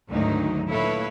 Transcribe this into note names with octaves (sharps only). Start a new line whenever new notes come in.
D2 G#2 D3 D#3 F#3 D#4
A#2 E4 A4 B4 C#5 F5